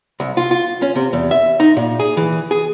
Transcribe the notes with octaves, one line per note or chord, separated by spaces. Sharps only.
C2
F4
F4
C#4
C3
E2
E5
D#4
A#2
G#4
E3
G#4